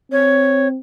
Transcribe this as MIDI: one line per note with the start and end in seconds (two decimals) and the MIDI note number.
0.12 0.79 60
0.12 0.68 73